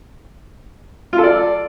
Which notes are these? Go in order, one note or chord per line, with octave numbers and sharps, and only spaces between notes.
F4
A4
D5